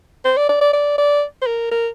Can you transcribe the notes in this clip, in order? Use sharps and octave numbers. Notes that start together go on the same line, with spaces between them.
C5
D5
D5
D5
D5
D5
C5
A#4
A#4